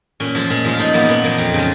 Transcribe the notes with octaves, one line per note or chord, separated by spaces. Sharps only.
A#2 C#4
F3 G#3
A#2
F3 G#3
F4
A#2 D#4
F3 A#3 B3
A#2 B3
F3 A#3
F2
C#3 F3 G#3